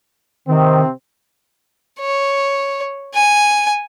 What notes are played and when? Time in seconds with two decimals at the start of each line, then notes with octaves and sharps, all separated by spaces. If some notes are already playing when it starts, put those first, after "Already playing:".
0.47 C3 D#3 C4
2.00 C#5
3.14 G#5